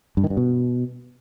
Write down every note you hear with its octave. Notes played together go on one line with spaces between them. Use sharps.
G2
D#3
G2
B2